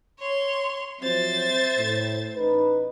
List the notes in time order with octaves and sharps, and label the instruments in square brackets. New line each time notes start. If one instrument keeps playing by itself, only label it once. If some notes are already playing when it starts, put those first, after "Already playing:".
[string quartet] C#5 C6
[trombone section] F3 F#3 C4 [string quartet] C5 E5 A6
[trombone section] A2
A1 D#4 B4